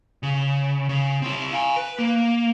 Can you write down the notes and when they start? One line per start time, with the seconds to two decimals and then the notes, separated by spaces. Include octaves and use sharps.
0.23 C#3
0.89 C#3
1.22 C4 E4
1.53 F5 G#5
1.76 B4
1.99 A#3